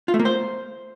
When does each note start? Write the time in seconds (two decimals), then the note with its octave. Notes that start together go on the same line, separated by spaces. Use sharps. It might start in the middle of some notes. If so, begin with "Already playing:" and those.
0.08 F4
0.14 A3
0.19 A#3
0.25 C5